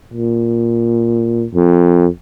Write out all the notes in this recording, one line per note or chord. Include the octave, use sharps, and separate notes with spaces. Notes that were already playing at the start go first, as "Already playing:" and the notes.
A#2
F2